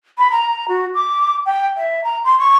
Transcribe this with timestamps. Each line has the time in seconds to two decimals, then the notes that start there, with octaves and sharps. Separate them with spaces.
0.18 B5
0.32 A#5
0.68 F#4
0.95 D6
1.46 G5
1.77 E5
2.04 A#5
2.25 C6
2.39 C#6